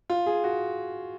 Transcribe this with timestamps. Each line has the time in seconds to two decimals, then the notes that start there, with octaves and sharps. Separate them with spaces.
0.10 F4
0.26 G#4
0.44 F#4